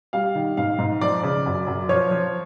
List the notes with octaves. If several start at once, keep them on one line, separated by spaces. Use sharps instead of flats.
G3 F5
D#3
G#2 F5
G#2
F3 D5
C#3
F#2
F#2
F3 C#5
F3